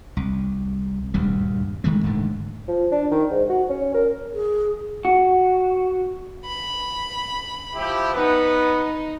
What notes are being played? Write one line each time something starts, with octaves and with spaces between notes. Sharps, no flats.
C2
D#1 D2 G2 G3
D#3 G#3 A3
D#1 G#2 D3 A3
F3
D4
D#3
G#2
F#4
C#4
A#4
G#4
F#4
B5
F3 E4 G4
B3 D#4 B4